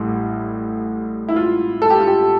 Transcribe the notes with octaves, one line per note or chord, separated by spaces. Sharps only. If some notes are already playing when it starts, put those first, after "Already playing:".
Already playing: A1 A2 G3 E4
E4
F4
A4
G4
F4
G4